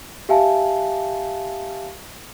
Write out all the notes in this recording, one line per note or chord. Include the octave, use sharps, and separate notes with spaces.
G4 E5 F5 G#5 A5